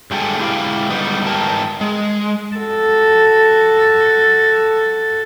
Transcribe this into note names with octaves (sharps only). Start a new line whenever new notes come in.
G2 G#3 G4 A4 G5 G#5
G#3 E4 G4 F5 G5
G3 B3 D#4
G#2 E3 A#4 G5 A5
G#3
F#4 A4